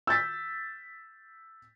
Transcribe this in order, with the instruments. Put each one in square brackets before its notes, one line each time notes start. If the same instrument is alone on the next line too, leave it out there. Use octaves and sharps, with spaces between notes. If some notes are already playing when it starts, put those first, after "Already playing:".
[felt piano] E6 G6 A6 B6